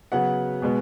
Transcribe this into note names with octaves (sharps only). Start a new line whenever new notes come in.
C#3 F#3 B3 F#5
B2 G#3 B3